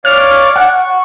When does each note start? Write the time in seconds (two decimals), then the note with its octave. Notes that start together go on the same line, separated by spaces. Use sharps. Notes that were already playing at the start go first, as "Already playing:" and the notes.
0.05 C#5 D5 F5 F6
0.56 F#5 C#6